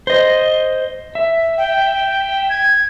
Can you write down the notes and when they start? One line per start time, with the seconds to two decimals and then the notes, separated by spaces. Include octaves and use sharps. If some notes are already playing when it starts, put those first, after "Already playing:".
0.07 C5 D#5
1.15 E5
1.58 G5
2.49 G#6